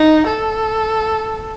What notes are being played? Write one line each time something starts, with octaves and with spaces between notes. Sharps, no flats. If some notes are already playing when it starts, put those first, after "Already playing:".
Already playing: D#4
A4